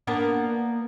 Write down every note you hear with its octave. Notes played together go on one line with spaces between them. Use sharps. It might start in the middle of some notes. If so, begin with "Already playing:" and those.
A#3 B3 D4